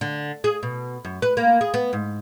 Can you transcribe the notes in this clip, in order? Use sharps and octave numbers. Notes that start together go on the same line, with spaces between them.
D3
G#4
B2
F#2
B4
A#3
G#4
B3
G#2